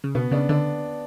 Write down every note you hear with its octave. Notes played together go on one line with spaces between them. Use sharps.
C#3
B2 B3
C#3 D4
D3 D4